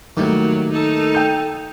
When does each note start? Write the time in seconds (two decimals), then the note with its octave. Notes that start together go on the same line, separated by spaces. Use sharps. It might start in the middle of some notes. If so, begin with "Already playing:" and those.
0.17 D#2 A2 D#3 F#3 G3
0.72 D#4 A4
1.15 G5 G6